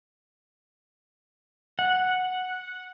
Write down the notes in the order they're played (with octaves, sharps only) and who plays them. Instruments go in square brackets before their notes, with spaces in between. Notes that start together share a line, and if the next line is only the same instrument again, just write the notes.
[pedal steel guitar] F#5